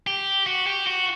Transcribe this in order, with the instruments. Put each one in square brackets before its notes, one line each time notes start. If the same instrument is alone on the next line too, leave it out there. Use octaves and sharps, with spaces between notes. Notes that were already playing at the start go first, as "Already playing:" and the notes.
[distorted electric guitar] G4
F#4
G4
F#4